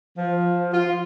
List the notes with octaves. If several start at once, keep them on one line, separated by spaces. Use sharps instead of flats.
F3
F4